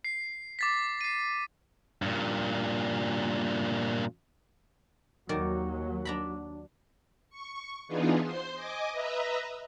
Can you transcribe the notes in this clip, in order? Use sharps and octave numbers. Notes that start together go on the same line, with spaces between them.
C7
D6 A6 B6
C7 D#7
G2 A#2
D#2 D#3 F#3 A#4 D5
D4 A#5 B5
C#6
E3 B3 D4 D#4 F4 G#4
C5 C6
D#5 G#5 D6
B4 D#5 E5 A#5